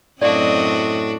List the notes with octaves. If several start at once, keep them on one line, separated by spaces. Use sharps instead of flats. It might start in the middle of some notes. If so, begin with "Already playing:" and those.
F#2 A2 C4 D4 F#4 D5 D#5 F5